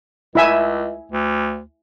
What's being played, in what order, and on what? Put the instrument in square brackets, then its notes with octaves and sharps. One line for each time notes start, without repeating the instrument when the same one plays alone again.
[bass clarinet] C#2 [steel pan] E4 E5 G#5
[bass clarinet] D2